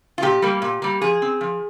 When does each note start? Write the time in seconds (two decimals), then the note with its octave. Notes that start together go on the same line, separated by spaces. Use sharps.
0.18 F4
0.22 A#2 G4
0.42 G3 A#3
0.62 A#2
0.82 G3 A#3
1.01 F3 G#4
1.22 C4
1.41 F3